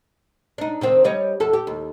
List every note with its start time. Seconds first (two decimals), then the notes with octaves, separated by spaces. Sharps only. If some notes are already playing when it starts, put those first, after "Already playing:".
0.58 D4 D#4
0.81 C3 D#3 C4
1.04 G3 C#5 D#5
1.40 E2 A4
1.53 G4
1.67 D#2